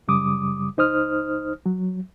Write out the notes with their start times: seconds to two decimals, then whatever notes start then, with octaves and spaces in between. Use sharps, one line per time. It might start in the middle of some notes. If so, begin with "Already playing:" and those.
0.08 F#2 C#3 G3 D6 D#6
0.77 C#2 D#4 C5 D#6 F6
1.66 F#3